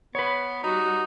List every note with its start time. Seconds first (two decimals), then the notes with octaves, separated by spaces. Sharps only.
0.15 B3 B4 C#5
0.63 G3 D#4 F#4